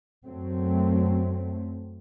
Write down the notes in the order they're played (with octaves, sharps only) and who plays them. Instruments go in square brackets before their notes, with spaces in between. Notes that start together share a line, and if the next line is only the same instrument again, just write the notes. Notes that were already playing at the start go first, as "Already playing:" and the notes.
[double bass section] F#2 F#3 A3 C4